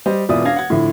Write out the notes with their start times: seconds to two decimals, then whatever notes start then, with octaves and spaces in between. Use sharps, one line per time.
0.06 G3 C5 D#5
0.29 E1 E2 F4 D5 E5 D#6
0.45 D4 F5 G#6 A#6
0.56 F#5 G#6
0.70 A2 D3 F3 E4